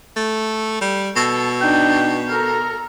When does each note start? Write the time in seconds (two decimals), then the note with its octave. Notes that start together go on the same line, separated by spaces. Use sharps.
0.16 A3
0.81 G3
1.16 B2 A4
1.61 D4 D#4 G5
2.30 A4 A#4 A#5